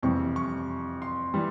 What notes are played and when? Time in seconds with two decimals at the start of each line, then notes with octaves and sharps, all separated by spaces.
0.03 F2 C3 E3 G3 C#6
0.36 C#6
1.02 C6
1.34 E3 G3